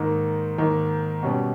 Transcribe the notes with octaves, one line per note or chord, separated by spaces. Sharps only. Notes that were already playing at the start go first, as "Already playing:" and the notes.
Already playing: G#2 D#3 A#3 D#4
G#2 D#3 A#3 D#4
B2 G3 C#4